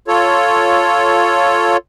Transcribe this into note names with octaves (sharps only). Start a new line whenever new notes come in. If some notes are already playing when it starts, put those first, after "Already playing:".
F4 A4 C#5